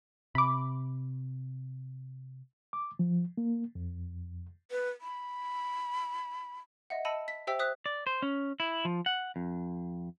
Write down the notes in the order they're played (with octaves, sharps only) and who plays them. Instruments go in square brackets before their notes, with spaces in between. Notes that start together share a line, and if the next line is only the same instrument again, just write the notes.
[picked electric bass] C3 [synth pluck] B5 D6
[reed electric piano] D6
F3
A#3
F2
[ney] B4
B5
[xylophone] D#5 E5 F#5
D#5 A5 B5 E6 C#7 D#7
B6
G4 C5 E5 G5 E6 B6
C5 D#6 F#6 B6
[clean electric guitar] D5
C5
C#4
E4
F3
F#5
F2